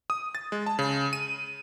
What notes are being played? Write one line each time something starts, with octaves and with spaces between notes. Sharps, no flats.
D#6
A6
G#3
A5
C#3
D#7